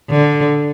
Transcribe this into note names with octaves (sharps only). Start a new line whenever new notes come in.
D3